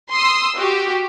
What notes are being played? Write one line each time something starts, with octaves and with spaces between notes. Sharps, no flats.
C6 D#6 E6
F#4 G4